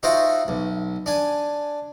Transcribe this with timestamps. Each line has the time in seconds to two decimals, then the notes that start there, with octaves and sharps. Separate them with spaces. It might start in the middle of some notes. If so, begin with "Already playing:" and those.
0.03 D#4 F4 F#4 C5 E5 G5
0.48 B1
1.06 D4 G#5